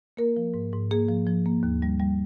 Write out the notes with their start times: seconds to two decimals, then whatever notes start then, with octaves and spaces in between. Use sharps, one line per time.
0.17 A#3 A#4
0.37 F3
0.54 G#2
0.73 G#2
0.91 A#3 G#4
1.08 F3
1.27 F3
1.46 A#3
1.63 D#2
1.82 G3
2.00 G3